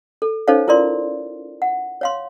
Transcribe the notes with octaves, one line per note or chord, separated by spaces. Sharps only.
A4
C#4 D#4 A4 C5 C#5 F5
E4 F4 A#4 D5 C6
F#5
C#5 F5 C6